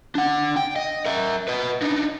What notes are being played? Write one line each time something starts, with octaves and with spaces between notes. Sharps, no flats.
D4 F#5
G5
D#5
A#4 E5
B4 D#5
D4 D#4